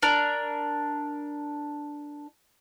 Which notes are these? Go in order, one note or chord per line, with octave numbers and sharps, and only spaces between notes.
D4 A#4